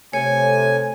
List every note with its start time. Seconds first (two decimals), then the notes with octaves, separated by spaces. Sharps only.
0.13 C3 A3 C#5 G#5